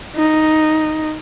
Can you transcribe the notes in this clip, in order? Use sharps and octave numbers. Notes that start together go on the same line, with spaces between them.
D#4